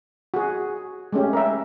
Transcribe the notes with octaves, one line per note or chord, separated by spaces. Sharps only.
F#4 G#4
G#3 A3 C#4 G4
A#4 E5